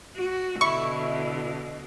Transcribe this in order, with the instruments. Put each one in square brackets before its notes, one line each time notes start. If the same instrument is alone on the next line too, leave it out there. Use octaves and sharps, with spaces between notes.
[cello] F#4
[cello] B2 D3 [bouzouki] E4 [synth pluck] C#6